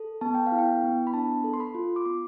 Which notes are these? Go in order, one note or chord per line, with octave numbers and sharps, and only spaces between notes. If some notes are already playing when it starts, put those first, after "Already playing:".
Already playing: A4
B3 A5
G5
F5
E4
G5
B3
B5
D4 A5
A4
C6
B5
F4
D6
B3 C6